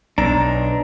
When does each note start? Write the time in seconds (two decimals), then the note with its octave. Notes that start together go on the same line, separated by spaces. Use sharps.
0.18 B1 D4 A#5